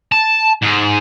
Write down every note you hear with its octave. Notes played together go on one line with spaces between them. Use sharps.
A5
G#2 G#4